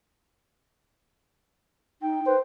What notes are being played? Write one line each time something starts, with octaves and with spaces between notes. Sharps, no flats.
D#4 G5
B4 C5